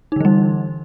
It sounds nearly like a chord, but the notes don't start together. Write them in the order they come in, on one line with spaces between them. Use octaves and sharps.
D#4 D3 E3 G3